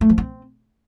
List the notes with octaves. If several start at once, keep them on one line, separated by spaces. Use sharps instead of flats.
A3
F3
C4